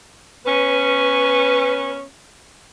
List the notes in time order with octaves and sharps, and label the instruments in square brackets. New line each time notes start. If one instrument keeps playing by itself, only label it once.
[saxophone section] B3 C#4 [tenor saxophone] B4